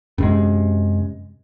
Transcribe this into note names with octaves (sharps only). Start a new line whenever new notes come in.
F#2 C3 G#3